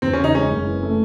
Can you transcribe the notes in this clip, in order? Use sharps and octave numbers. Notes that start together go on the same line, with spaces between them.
E2 C4
C#4
C#3
D#4
G#3 C#4
F#1
E3
A3